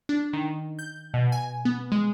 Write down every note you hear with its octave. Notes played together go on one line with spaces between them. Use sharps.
D4
D#3
G6
B2
G#5
B3
G#3